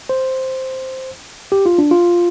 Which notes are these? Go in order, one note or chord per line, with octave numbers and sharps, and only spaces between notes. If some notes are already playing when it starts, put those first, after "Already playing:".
C5
G4
F4
D4
F4